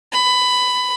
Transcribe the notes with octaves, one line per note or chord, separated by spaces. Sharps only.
B5